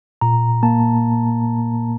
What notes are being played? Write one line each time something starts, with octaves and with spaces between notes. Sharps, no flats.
A#2 A#5
A#3 A5